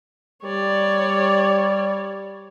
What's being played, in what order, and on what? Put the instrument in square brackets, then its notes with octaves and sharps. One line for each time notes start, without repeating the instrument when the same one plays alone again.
[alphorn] G3 [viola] C#5 D5